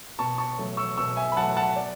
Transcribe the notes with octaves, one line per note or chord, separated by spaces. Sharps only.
B2 A5 C#6
A5 C#6
F#3 A3
C#6 E6
B2 C#6 E6
E5 G#5
B5
F#3 A3 F#5 A5
F#5 A5
D5